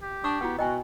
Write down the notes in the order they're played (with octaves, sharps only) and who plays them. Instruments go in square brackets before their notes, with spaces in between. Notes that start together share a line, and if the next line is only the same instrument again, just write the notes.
[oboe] G4
[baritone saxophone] D4 [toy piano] C#6 D#6
[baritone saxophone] B3 [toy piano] E4 F#4 F#5
[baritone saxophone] B2 [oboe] F#4 [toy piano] D#5 G5 G#5